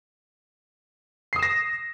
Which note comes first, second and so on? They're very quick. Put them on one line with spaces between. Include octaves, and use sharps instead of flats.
C7 D#6 E7 A#6